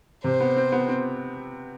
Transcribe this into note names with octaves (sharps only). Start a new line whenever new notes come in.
C3 C5
B3
C4
B3
C4